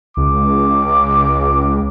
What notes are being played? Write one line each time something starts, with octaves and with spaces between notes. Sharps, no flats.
C#2 D6